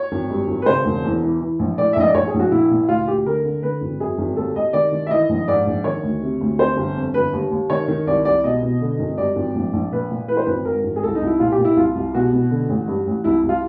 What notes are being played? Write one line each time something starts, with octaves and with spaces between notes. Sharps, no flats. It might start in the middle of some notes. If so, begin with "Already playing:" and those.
Already playing: C#5
G#1
G2
G#1
B4
C#3 C5
E1
E2
E3
E3
A#1
A2 D5
E5
A#1 D#5
D5
A#1 C#5
G#4
A#1
F#4
A#2 E4
A#2
D2 F4
D2 G4
D3 A#4
D3
D3 B4
G#1
F#2 G#4
G#1
D#2 A4
D#2 D#5
D#3 D5
D#3
E5
E3 D#5
A#1
G#2 D5
A#1
D#3 C#5
D2
C3
D2
C3 C5
G1
F2
G1 B4
D#2
D#2
D#3 C#5
D#3
C2 D5
C2 D5
B2 D#5
B2
D3
G#1
G2 D5
G#1
A#1
A#1
A#2 B4
A#2
E3 B4
C5
G#1 B4
G#2 A#4
G#1
G#4
C2 A4
D#4
C2
E4
A#2 F4
G4
A#2
E4
C2 F4
C2
B2 F#4
B2
D3
A1
G2
A1
C2 E4
C2
F4